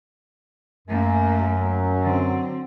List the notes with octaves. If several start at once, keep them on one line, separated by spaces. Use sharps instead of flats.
F#2 A3 A#3
F#3
D3 C4